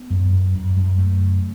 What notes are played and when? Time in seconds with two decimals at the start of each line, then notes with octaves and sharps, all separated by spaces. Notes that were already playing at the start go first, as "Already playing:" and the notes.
Already playing: B3
0.10 F#2
0.33 F#2
0.55 F#2
0.76 F#2
0.98 F#2 A3
1.21 C#3